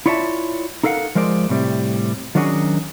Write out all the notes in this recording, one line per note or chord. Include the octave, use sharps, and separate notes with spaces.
E4 F4 C#5 D5 E5 A5
D#4 A4 A#4 F5 F#5
F3 G#3 A#4 C5 D5
A2 C3 G3
D#3 F#3 C#4 D4 F#4 G#4